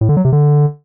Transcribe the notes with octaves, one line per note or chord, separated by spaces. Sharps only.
A2
D3
F#3
C3
D3